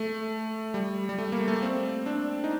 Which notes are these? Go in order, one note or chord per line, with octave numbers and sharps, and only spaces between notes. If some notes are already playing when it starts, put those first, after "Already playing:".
Already playing: A3
G3
G3
A3
A#3
A3
C4
D4
D#4